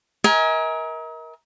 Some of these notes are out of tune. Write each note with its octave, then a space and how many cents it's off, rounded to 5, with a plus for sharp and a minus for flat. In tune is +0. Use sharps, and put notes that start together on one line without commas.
A#4 +20 D#5 +45 G#5 +0